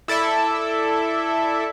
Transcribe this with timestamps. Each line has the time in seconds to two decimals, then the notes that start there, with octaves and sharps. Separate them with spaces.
0.08 E4 A4 D5 E5